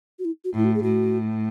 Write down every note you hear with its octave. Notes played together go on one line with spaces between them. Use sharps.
F#4
E4
F#4
A2 E4
F#4
G#4
A2 F#4